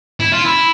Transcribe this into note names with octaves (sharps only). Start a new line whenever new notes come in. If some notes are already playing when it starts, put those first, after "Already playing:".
E4
F4
E4